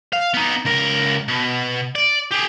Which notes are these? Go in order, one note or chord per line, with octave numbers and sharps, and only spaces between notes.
F5
B3 D#4
C#2 A#4
B2
D5
G4 G#4